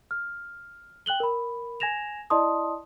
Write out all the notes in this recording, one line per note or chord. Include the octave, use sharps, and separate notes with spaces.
F6
G5 F#6 F#7 G7
A#4 B5
G#5 G#6 A#6 E7 F7
E4 D5 D#5 A5 C6 D#6